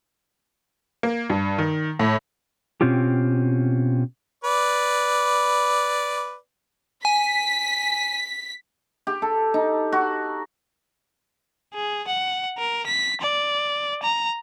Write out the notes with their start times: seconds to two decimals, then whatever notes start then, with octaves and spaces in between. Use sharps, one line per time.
1.03 A#3
1.30 G2
1.58 D#3
1.99 A2
2.81 B2 C4 C#4 F4 G4
4.44 B4 D5
7.05 G#5 B6
9.07 G4
9.22 A4
9.54 D#4
9.92 F#4
11.73 G#4
12.07 F#5
12.58 A#4
12.86 B6
13.21 D5
14.03 A#5